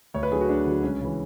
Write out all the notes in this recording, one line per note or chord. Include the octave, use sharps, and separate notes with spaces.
D2 C#5
B4
D3 F#3 G#4
F#4
D2 D4
D3 F#3
C#2 C#4
C#3 E3